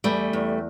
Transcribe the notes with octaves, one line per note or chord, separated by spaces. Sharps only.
E2 G3 A3
E2